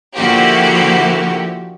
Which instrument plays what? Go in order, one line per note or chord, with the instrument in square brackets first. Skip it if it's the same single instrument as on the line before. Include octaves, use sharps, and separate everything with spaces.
[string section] D3 F3 A#3 E4 F#4 G4